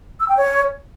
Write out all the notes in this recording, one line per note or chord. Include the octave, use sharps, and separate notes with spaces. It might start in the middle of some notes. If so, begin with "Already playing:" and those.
E6
G5
C#5